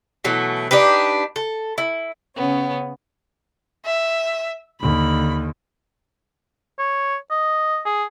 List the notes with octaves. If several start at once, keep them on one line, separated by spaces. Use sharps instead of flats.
B2 E3 F#3 A3
D4 D#4 G4 B4
A4
E4
C#3 B3 C#4
E5
D#2 D3 B5
C#5
D#5
G#4